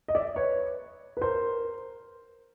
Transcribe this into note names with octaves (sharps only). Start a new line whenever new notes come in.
D#5
D5 E5
B4 C#5
B4
A#4 C5